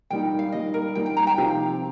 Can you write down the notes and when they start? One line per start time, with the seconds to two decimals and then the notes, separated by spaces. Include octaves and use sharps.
0.10 A#2 G3 D#4 G5
0.39 F5
0.52 A#2 G3 D#4 D#5
0.74 A#4
0.95 A#2 G3 D#4 G5
1.06 G5
1.17 A#5
1.27 G5
1.37 C3 F3 C4 D#4 G4 F5